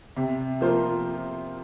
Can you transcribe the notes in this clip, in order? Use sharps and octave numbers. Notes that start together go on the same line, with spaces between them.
C3
F3 A#3 F4 C5